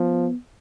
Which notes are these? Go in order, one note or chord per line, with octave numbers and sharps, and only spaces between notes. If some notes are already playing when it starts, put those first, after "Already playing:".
Already playing: F3 B3